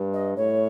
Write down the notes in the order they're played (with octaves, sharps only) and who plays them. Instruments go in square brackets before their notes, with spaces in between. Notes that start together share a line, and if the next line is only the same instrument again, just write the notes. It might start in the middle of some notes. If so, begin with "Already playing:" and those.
Already playing: [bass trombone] G2
[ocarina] D#5
[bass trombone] A2 [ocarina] C#5